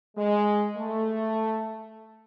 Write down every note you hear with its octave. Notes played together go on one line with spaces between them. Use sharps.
G#3
A3